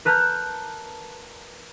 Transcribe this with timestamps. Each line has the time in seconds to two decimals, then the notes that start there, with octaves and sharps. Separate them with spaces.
0.05 A#4 B4 A5 A#5 F6 G6